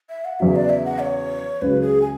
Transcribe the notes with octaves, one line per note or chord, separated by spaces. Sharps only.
E5
F#5
E2 C#3 F#3 E5
D5
E5
F#5
C#5
C#2 C#3 F#3 B4
G#4
G#5